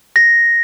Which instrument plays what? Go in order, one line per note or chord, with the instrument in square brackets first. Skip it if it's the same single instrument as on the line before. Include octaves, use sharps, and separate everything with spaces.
[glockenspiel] A#6